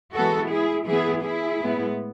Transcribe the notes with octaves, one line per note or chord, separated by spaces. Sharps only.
E3 G#3 B3 F#4 A4
E4 G#4
E3 B3 E4 G#4
E4 G#4
A2 G#3 B3